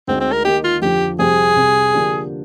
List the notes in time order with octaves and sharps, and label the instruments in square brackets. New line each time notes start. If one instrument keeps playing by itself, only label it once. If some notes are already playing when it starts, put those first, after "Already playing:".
[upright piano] D2 D3 G#3 D#4 [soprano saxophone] C4
[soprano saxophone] C4
A#4
[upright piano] D#3 A#3 D#4 [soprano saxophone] G4
[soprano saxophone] F4
[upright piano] F2 D3 F3 [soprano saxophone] G4
[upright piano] F2 C3 G3 C4 G4 [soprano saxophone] G#4
[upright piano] C2 C3 G3
D3 F3 A#3 D4 G4